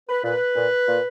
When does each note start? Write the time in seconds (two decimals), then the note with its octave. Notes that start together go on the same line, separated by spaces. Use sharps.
0.09 B4
0.24 A#2 B4
0.56 A#2
0.88 A#2